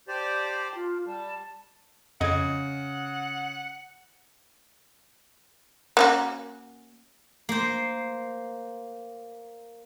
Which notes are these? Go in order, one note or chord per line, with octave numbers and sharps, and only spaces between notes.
G4 C5 D5 A5
F4
G3 A5
F2 C#3 D#5 F#5 G#6
A#3 C#4 F#4
A#3 C5